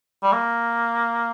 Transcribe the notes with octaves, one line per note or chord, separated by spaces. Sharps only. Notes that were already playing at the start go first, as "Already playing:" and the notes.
G3
A#3